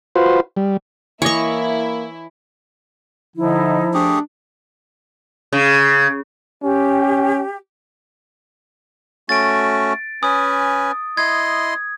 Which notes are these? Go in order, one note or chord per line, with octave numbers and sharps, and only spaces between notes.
F4 F#4 B4 C5
G3
E3 A#3 E4 C#5 D#5 C#6
D3 F3 D#4 E4
A3 D4 G4 G#4
C#3
C#4 G4
A3 C#4 F#4 A6 D7
C#4 B4 G#5 D#6
E4 D#5 C6 G#6